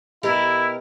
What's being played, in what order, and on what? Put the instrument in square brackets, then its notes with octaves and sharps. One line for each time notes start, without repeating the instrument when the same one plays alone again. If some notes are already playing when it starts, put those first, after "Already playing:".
[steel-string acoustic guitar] B2 G4 A#4 [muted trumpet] E4